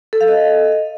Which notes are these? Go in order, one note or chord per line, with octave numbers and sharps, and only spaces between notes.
A4
F5
D#5